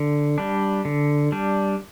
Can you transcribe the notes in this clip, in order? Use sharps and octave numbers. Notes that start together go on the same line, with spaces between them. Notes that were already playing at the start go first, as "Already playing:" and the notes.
Already playing: D3
G3 D4
D3
G3 D4